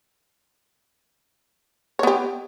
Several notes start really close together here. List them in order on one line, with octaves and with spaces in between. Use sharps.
C#5 B3 G4